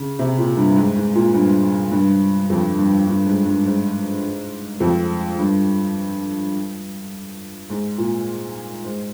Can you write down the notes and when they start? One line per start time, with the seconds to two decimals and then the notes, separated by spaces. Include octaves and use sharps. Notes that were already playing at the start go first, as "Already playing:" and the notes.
Already playing: C#3
0.19 C3
0.38 A#2
0.57 G2
0.76 G#2
0.96 G#2
1.15 A#2
1.34 G2
1.91 G2
2.50 F2
2.78 G2
3.07 G2
3.26 G#2
3.45 G2
3.65 G#2
4.80 F2
5.39 G2
7.70 G#2
7.98 A#2
8.85 G#2